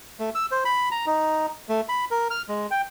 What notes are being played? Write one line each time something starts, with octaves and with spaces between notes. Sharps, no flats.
A3
E6
C5
B5
A#5
D#4
A3
B5
A#4
F6
G#3
G5